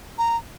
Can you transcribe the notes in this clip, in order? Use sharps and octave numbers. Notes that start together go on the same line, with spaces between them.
A#5